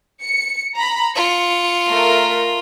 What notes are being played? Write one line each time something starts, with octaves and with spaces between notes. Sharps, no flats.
C#7
A#5 B5
F4 C#7
A3 A#4